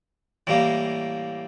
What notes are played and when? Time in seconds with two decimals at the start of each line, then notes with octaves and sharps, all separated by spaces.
0.47 A2 E3 G3 A#3